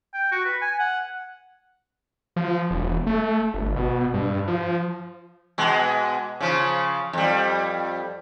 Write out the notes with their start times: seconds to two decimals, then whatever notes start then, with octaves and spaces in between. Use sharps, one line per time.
0.14 G5
0.32 F#4
0.45 B4
0.62 G#5
0.80 F#5
2.36 F3
2.71 E1
3.07 A3
3.54 G1
3.76 B2
4.14 G2
4.47 F3
5.58 B2 G#3
6.40 C#3 F3
7.13 F2 G3